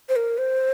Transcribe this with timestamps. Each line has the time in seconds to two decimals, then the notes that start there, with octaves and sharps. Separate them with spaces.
0.09 C5
0.16 A#4
0.38 C5